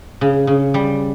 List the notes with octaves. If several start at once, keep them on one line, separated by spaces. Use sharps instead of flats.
C#3
C#3
G3